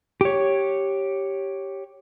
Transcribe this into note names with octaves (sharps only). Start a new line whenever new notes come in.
G4 C#5